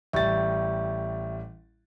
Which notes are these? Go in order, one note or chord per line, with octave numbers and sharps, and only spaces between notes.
A1 G3 E5 C#6 G6 A6